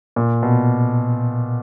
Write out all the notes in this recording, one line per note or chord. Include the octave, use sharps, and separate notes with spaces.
A#2
B2